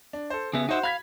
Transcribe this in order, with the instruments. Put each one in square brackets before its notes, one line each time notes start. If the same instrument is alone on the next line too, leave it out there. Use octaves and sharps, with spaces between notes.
[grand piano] D4
A4 C5
[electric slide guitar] C#3 B3 [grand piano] G#4 E5
[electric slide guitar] D#4 E5 [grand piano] F#4 C5 F#5
[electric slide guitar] F5 [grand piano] B5 G#6 B6